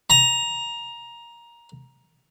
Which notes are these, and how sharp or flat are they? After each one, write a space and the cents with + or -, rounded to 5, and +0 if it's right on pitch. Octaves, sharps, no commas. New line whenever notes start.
A#5 +15